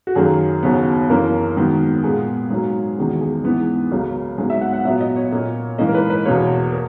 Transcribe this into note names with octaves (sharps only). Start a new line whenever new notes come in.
F#4
F#2 D#3 F#3 A#3 G#4
D#2 C#3 F#3 B3
F#2 E3 A#3 A#4
G#2 D#3 F#3 B3
A#2 G#3 B3 G#4
G#2 F#3 A#3
E2 D#3 G#3 B3 F#4
G#4
G#2 E3 B3
C#2 C#3 F#3 A#3
G#2 F#3 B3 G#4
E5
F#5
F#5
A#2 F#3 B3 E5
D#5
C#5
A#2 A#3
G#2 E3 A#3 D#5
A#4
B4
B4
E2 B2 A#3 C#5
A#4